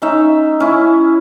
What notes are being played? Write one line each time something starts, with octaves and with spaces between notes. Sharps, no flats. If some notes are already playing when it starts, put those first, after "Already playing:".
C#4 D#4 E5
C#4 E4